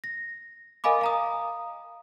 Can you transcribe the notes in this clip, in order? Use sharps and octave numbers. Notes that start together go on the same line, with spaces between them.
A#6
A#4 D#5 F5 G#5 B5 D6
F5 A#5 D#6